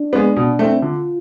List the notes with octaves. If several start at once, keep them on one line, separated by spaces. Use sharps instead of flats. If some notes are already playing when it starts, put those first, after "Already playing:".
Already playing: D4
G#3 B3
B2
A3 C4 E4
D3 F4